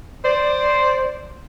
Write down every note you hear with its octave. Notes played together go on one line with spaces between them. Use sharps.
C5 D5